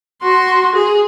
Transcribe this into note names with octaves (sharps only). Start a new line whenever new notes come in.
F#4 C6
G#4